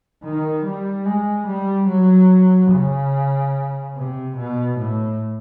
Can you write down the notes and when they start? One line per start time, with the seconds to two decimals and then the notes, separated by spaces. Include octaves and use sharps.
0.23 D#3
0.65 G3
1.05 G#3
1.47 G3
1.88 F#3
2.71 C#3
3.96 C3
4.36 B2
4.78 A2